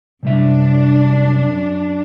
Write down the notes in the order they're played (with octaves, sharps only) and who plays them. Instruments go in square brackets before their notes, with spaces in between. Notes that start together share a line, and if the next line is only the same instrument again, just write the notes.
[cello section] F#2 D4 [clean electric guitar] C3 G3 E5